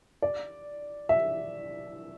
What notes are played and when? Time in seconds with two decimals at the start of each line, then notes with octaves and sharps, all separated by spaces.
0.22 D5
1.09 E5